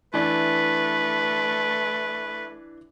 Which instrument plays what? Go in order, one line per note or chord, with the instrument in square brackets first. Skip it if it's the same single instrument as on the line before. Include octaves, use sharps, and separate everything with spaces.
[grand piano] E3 D4 [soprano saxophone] A3 [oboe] B4